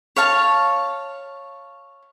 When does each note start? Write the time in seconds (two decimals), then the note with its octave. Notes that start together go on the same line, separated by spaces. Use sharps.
0.16 C#5 F5 A5